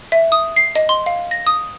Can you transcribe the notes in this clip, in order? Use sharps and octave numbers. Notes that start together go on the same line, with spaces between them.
E5
D#6
C7
D#5
C6
F5
A#6
D#6